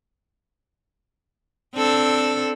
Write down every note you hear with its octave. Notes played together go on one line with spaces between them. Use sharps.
C4 D4 A4